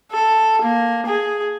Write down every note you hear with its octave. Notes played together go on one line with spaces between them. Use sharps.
A4
A#3
G#4